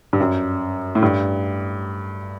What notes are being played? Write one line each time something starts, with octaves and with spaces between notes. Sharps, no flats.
G2
F#2
A2
G2